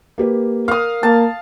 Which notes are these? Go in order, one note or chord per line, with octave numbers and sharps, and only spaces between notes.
A#3 G4 B4
A#4 F5 D#6
A#3 A5